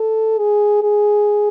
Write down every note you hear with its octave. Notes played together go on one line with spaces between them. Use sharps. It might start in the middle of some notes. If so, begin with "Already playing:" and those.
Already playing: A4
G#4
G#4